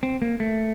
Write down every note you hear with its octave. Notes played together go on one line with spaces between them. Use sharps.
C4
A#3
A3